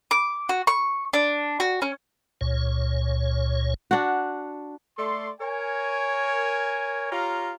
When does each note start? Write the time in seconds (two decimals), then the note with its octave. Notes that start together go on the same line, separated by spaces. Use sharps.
0.11 D6
0.49 F#4
0.67 C#6
1.13 D4
1.60 F#4
1.82 C#4
2.41 C#2 A#2 C#5
3.91 D4 F#4
4.98 A3 A4 D5 C6
5.41 A#4 C#5 G#5
7.12 F4 G4 C#5 F5 A#5